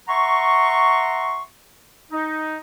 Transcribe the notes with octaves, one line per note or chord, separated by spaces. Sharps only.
E5 F#5 A#5 C6 C#6
D#4